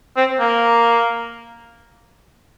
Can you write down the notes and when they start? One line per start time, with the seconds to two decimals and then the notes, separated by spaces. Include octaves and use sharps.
0.17 C4
0.40 A#3